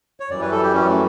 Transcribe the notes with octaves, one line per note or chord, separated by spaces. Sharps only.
C#5
F#2 E3 G3 D5
B4
A4
G4
C#4
A3